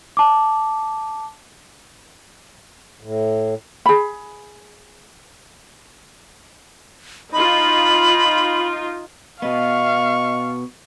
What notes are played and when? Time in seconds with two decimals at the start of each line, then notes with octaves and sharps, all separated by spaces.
0.17 A5 D6
3.01 A2
3.86 G#4 B5
7.33 D#4 F4 B5
9.42 B2 B3 D#5 F5 C#6